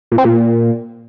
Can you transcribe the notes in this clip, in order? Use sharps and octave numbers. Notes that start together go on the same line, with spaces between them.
A#2
C4
A#2